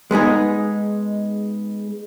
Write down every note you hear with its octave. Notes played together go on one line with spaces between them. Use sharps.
G#3 B3 D#4 G#4